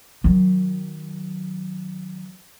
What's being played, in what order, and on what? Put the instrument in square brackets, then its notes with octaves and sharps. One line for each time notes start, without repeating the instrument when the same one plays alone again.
[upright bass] D#3 F#3